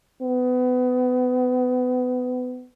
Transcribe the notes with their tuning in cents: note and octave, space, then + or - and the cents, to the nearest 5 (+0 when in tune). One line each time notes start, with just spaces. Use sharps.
B3 +30